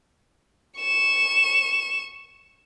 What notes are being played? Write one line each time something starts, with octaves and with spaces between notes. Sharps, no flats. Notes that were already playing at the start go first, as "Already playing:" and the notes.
C#6 E7